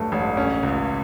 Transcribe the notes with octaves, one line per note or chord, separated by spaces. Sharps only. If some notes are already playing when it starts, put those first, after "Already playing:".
Already playing: A1 G2 F#3 A3
A1
C#4
C#2